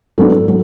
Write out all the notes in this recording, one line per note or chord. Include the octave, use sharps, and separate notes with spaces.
G#2 F#3 B3 D4 A4
F#3 A4